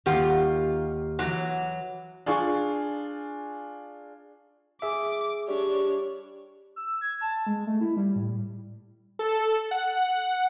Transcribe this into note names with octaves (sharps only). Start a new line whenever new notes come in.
D#2 D#3 F4 G4 F#5
E3 F#3
D4 F4 G#4 C#6
G#4 E5 D6
G3 D4 C#5
E6
G#6
A5
G#3
A3
E4
G3
A2
A4
F#5